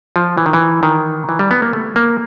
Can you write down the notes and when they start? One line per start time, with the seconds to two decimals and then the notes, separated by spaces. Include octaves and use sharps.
0.16 F3
0.38 E3
0.46 D#3
0.53 E3
0.83 D#3
1.29 E3
1.39 G3
1.51 B3
1.62 A#3
1.73 A3
1.96 A#3